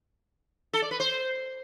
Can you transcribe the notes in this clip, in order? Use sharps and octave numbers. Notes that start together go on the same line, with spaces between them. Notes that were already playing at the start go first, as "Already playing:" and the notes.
A4
D5
B4
C5